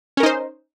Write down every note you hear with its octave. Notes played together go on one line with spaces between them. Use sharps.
C#4 D#4 A#4 C5